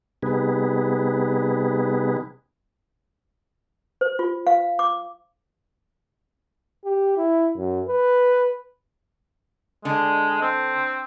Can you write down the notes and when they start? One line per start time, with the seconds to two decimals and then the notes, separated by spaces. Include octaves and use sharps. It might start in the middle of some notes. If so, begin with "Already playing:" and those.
0.22 C3 G3 B3 D#4 G#4 B4
4.01 C5
4.19 F4
4.47 F5
4.79 D6
6.85 G4
7.17 E4
7.56 F#2
7.88 B4
9.85 D3 G#3
10.42 C4